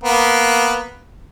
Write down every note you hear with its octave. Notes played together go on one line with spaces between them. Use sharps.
A#3 B3